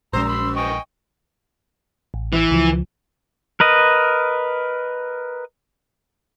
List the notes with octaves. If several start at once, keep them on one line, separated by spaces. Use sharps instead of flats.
A#1 F#2 G#3 C5 A#5 E6
B5 C6
D#5 G5 G#5 C#6
A1
E3
C#2 F3
A#4 B4 D#5